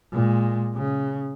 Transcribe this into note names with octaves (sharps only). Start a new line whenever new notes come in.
A#2 G#3
C#3